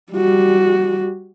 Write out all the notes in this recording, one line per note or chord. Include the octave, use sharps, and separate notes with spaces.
G3 F#4